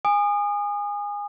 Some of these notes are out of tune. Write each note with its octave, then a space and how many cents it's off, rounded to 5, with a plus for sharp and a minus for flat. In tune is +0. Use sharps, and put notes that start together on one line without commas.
G#5 -20 D#6 -30